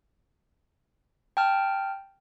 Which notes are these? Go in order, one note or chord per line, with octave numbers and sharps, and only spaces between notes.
G5 A5 F6